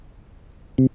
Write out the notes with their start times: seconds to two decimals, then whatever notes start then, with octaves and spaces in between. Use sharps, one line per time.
0.78 C3